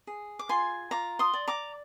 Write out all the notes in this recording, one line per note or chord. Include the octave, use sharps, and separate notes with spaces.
G#4
D6
F4 G#5 C6
F4 A#5 D6
C6 D#6
D5
A#5 D6